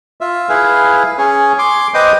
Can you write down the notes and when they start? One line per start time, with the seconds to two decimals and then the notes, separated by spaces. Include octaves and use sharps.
0.21 F4 E5
0.49 E4 G#4 B4 F5
1.18 C#4 G#4 C#5
1.59 C6 D6
1.94 B4 C5 D#5 G5 D6 D#6